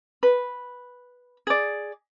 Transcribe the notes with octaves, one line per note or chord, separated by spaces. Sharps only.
B4
G#4 D5